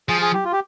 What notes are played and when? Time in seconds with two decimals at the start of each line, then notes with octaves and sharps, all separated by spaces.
0.09 F3 G#4
0.21 G#4
0.34 G4
0.45 F4
0.52 G4